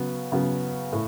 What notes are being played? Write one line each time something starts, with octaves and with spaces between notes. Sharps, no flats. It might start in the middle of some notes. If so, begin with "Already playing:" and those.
Already playing: C#3 F#3 B3
C#3 F#3 B3
A2